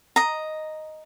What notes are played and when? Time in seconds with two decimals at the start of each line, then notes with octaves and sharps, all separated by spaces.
0.16 D#5 A#5